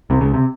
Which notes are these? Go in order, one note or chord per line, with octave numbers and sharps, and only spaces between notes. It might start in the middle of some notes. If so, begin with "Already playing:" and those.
C2 C3
C#2 C#3
C3